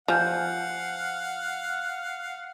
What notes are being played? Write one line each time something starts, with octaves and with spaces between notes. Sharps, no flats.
F3 F5 F#5 G#5 F6 G6